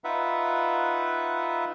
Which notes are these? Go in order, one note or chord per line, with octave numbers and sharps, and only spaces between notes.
D#4 F4 B4 E5 F#5